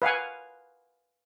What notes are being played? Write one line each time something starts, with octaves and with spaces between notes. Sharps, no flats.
B4 F5 F#5 G#5